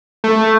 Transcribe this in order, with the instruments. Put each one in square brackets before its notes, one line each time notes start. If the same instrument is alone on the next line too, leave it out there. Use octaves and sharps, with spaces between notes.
[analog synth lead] A3